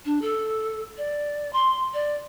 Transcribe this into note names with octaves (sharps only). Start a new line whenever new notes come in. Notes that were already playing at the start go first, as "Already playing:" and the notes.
D4
A4
D5
C6
D5